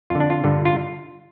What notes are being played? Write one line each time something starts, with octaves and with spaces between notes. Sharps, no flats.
F2 D3 F4
D4
F4
G2 D3
F4